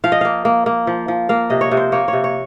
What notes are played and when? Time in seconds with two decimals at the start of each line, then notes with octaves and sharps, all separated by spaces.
0.04 F3 F5
0.12 D#5
0.21 A#3 F5
0.45 A#3
0.66 A#3
0.87 F3
1.08 F3
1.29 A#3 F5
1.50 C3 D#5
1.61 C#5
1.71 C3
1.77 C5
1.92 A#3 C#5
2.08 C3 C#5
2.24 C#5